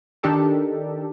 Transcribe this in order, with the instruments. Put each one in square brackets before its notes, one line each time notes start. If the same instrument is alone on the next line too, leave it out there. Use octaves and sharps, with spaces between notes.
[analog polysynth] D#3 D4 D#4 G4 A4 A#4